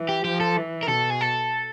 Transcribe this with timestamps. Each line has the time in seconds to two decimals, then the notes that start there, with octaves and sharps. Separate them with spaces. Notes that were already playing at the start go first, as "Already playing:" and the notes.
Already playing: E3
0.09 G4
0.25 F3 G4
0.40 A4
0.56 E3
0.83 A#4
0.88 B2 A4
1.10 G#4
1.21 A4